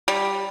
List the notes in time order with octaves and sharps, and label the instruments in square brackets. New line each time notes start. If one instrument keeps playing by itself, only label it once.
[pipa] G3